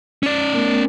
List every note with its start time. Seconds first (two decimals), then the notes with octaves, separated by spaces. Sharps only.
0.23 C#4 D5
0.53 A3 B3 A#4